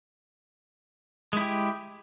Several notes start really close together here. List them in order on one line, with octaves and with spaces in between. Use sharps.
G#3 E4 G4